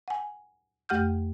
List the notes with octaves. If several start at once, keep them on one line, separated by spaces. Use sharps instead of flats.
F#5 G#5
F2 A3 G4 F#5 F6 G6